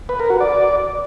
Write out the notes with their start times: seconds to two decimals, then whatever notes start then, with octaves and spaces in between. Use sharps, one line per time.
0.09 B4
0.20 A#4
0.30 F#4
0.40 D5